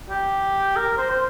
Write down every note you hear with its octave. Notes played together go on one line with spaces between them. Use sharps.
G4
A#4
C5
C5